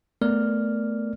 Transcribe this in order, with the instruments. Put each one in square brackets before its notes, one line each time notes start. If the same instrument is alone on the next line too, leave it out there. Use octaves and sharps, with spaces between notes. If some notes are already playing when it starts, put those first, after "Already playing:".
[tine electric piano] A3 B3 A#4 D5 F6